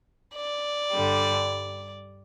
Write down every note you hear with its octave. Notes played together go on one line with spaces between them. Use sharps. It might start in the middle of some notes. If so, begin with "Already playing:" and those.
D5
G2 D3 G3